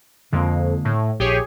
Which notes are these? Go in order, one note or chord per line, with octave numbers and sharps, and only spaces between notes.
F2 D3 G#3 A#3
A2
A#1 G4 G#4 C#5